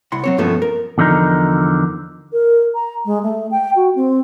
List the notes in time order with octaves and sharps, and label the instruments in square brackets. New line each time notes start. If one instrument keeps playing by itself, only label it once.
[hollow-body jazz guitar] C2 E4 F#5 C6
F#3 C4 C#5
G2 B2 F3 A3 B3 C#4
A#4
[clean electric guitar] E2 D3 F3 D#4 A#4
[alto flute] A#4
A#5
G#3
A3
G5
F#4
C4